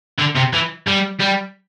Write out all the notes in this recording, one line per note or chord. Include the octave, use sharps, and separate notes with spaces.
D3
C3
E3
G3
G3